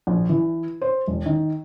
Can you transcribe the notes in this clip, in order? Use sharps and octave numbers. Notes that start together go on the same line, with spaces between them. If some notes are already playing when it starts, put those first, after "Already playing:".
A#1
E3
C5
E1
D#3